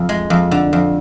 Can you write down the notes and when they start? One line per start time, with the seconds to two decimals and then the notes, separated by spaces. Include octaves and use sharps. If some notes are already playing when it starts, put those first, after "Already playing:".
Already playing: F2
0.09 G#3
0.30 F2
0.51 D3
0.73 F2